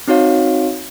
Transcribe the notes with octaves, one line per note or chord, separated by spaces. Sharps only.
C4 D#4 F#4 C#5 F5